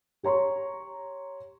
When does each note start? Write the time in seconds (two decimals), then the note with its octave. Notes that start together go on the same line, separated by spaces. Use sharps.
0.23 G4 C#5 A#5 C6 C#6